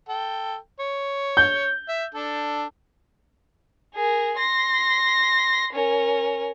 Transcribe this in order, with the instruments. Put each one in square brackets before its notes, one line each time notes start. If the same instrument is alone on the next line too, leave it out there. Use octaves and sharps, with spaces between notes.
[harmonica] A4 G5
C#5
[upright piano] G6
[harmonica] E5
D4 A4
[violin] G#4 A#4
C6 A#6
C#4 A#4